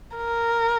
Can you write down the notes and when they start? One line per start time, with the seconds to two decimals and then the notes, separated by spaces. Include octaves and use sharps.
0.17 A#4